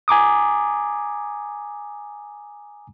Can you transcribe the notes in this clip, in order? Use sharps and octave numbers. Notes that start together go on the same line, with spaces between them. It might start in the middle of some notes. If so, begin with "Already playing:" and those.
G#5 A#5 D6 D#6